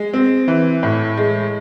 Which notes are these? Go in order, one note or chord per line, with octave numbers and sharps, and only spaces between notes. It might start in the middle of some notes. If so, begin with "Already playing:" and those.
Already playing: G#3
C4
E3
A2
G#3